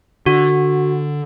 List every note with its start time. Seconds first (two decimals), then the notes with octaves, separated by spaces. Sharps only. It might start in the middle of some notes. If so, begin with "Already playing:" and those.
0.26 D3 F#4